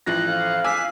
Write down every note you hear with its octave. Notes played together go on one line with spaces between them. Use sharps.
A1 F3 F#6 A#6
F2 F5
G#5 D6 E6 B6